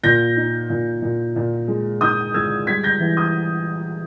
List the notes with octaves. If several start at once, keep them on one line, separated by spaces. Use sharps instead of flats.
A#2 G6 A#6
D#4
A#2
A#2
A#2
G#3
D#4 D#6 G6
G#3 E6 G#6
G3 G#6 B6
G6 A#6
E3
D#6 G6